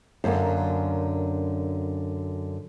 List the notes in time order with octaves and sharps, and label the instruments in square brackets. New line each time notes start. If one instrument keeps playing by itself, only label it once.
[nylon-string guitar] F#2 D3 A#3